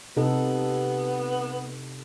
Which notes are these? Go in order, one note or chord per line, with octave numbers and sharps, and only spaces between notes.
C3 B3 D#4 A4